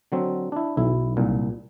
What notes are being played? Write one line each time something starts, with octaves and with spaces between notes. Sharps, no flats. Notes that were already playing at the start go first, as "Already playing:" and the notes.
D3 F#3 C4
D4 E4
B1 E4
C2 A#2